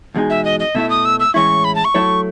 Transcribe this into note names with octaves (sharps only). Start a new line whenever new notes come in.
E2 B2 G#3 D#4 G#4
E5
D#5
D#5
B2 A3 E4 E5
D#6
E6
E6
A2 E3 G#3 C#4 E4 C#6
B5
A5
C#6
F#3 A3 E4 A4 C#5